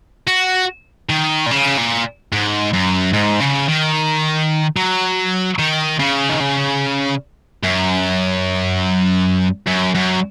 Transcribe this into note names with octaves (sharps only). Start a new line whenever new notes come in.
F#4
D#3
A#2
C#3
A#2
G#2
F#2
G#2
C#3
D#3
F#3
D#3
C#3
D#3
C#3
F#2
F#2
F#2